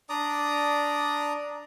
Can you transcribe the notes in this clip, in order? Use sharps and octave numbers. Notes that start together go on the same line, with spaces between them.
D4 D5 A#5 D#6